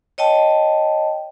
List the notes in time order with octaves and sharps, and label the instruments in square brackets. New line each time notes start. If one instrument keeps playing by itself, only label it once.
[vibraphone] C#5 D#5 G5 A5